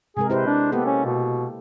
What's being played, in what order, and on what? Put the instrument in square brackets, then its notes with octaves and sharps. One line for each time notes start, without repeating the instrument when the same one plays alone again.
[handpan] C3 G#3 A#4 [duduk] G#4
[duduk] C3 [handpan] E4 B4 C5
[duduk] D4
[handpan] A#3 G4 A4 [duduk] B3
[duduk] C#4
B2